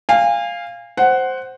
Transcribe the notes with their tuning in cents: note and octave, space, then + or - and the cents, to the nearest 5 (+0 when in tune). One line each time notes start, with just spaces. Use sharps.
F5 -5 G#5 -35
C5 +0 F#5 +10